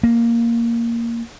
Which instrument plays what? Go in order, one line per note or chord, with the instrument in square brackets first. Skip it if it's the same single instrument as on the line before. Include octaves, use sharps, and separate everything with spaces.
[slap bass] A#3